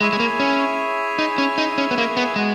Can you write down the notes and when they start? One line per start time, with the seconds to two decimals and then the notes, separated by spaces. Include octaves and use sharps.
0.01 G#3 E4 G#4 C#5 E5 G#5
0.13 G#3
0.20 A#3
0.40 C#4
1.19 D#4
1.38 C#4
1.58 D#4
1.78 C#4
1.91 B3
1.98 A#3
2.17 B3
2.36 G#3 B3 F#4 B4